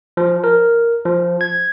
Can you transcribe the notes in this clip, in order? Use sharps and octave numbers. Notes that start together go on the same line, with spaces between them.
F3
A#4
F3
G#6